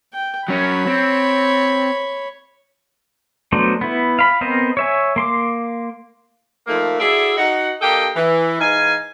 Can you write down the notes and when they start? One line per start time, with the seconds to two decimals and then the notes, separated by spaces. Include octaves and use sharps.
0.13 G5
0.48 F#3 C#4 C#5 B5
0.87 C4
3.52 F#3 A3 B3 D4 C5
3.81 B3 E4
4.19 F5 B5
4.41 B3 C4 A#4 C5 D#5
4.77 C#5 E5 G#5
5.16 A#3 C6 D6
6.67 D#3 F3 A3 A#3
6.99 E4 F#4 G#4 A4 D5 E5
7.37 D#4 F#4 D#5 F#5
7.81 A#3 D4 G4 A4 D#5 G5
8.16 E3
8.61 G#2 E3 D#4 F5 G#5